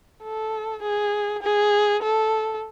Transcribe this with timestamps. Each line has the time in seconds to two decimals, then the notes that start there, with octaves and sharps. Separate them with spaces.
0.23 A4
0.82 G#4
1.43 G#4
2.02 A4